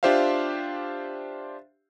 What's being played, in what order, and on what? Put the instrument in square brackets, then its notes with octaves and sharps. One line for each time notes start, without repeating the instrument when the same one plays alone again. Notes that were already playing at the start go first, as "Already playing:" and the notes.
[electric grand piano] D4 F4 G4 C5 E5 F5